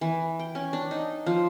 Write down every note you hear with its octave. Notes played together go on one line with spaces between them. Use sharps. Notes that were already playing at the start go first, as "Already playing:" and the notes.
E3
G5
C#4
D4
D#4
F3